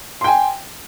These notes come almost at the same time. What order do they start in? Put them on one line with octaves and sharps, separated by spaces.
C6 G5 G#5